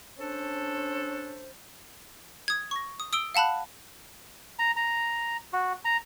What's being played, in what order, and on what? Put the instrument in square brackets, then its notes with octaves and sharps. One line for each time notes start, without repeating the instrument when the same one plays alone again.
[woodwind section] C#4 D4 A4 C5
[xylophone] D#6 G#6
C#6 A#6
D#6
D#6 E6 D7 G7
F5 F#5 A5 B5 F#6
[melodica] A#5
A#5
F#4
A#5